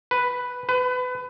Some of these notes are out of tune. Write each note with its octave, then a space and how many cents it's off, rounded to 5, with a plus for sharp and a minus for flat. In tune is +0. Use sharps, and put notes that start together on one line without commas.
B4 +0
B4 +25